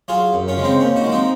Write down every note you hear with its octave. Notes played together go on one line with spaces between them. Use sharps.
F#3 F4 G#4
F#2
C#4 F4
C#3 G#3
C4 D#4
A#2 C#4
D#4 F#4
G#3
F3 C4 D#4